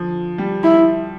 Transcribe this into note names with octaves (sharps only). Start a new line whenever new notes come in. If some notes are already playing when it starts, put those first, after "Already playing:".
Already playing: D3 F3
G3
E4